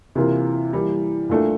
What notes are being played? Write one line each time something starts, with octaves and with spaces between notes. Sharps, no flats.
C3 E3 A#3 F4
E3 G3 A#3
A#2 A3 D4 A4